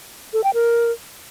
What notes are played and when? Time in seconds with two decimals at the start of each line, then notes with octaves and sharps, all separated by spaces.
0.33 A4
0.44 G5
0.54 A#4